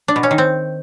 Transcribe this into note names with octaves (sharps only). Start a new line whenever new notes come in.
D4
B2
C#4
D#3
C4